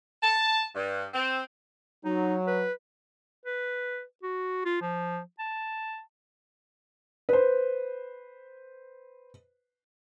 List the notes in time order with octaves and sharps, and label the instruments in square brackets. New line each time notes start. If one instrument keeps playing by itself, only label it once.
[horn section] A5
G2
C4
[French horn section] F#3 [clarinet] D#4
[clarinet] B4
B4
F#4
F4
F3
A5
[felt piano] B4 C5